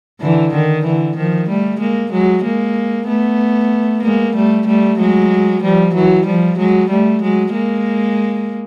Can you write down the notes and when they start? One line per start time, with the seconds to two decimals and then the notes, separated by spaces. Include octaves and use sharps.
0.21 D3 E3
0.53 D#3
0.84 D3 E3
1.17 D#3 F3
1.49 G3 A3
1.80 G#3 A#3
2.12 F#3 G#3
2.44 G#3 A#3
3.07 A3 B3
4.03 G#3 A#3
4.36 G3 A3
4.67 G3 A3
4.99 F#3 G#3
5.63 F3 G3
5.94 E3 F#3
6.26 F3 G3
6.58 F#3 G#3
6.90 G3 A3
7.22 F#3 G#3
7.54 G#3 A#3